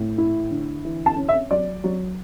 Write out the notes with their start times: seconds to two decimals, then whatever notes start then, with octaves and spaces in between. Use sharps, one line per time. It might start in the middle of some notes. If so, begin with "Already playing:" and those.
Already playing: A2
0.18 E4
0.51 D3
0.85 E3
1.06 A5
1.17 C#4
1.29 E5
1.50 F#3 D5
1.84 F#3